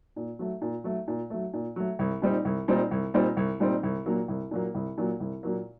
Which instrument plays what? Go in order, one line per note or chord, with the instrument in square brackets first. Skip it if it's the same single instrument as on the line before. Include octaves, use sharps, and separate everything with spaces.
[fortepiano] A#2
F#3 A3
A#2
F#3 A3
A#2
F#3 A3
A#2
F#3 A3
C2
A#2 G3 C4 D#4
C2
A#2 G3 C4 D#4
C2
A#2 G3 C4 D#4
C2
A#2 G3 C4 D#4
C2
A#2 F#3 A#3
C2
A#2 F#3 A#3
C2
A#2 F#3 A#3
C2
A#2 F#3 A#3